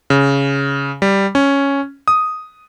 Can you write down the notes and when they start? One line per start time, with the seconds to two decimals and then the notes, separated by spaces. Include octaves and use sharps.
0.10 C#3
1.02 G3
1.35 C#4
2.08 D#6